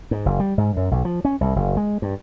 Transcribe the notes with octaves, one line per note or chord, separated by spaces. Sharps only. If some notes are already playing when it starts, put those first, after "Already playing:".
G#2
F#1
G3
G#2
F#2
B1
F3
C#4
C2
F#1
G#3
G2